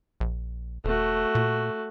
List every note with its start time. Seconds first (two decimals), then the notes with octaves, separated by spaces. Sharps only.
0.20 A#1
0.85 D#1 A3 F#4
1.35 A#2